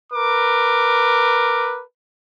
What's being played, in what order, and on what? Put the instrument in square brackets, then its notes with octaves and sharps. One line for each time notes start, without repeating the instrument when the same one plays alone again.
[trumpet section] A#4 B4 D6